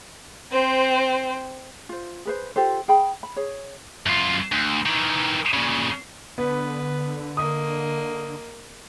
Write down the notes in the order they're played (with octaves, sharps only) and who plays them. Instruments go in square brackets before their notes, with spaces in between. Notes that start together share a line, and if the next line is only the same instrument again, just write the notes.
[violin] C4 C5
[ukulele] F4 C5
G#4 B4 C5
F4 G4 A4 C5
G#4 G5 B5
B5
G#4 C#5
[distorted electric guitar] F#2 F4
D2
D#3 E3
A#2 C#3
[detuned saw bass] D3 [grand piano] B3 [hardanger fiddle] B4
[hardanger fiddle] A#3 D#5 [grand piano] D#6